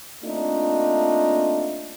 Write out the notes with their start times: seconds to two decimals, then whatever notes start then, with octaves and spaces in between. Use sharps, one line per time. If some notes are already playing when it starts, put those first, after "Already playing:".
0.24 A3 A#3 C4 D4 D#4 F4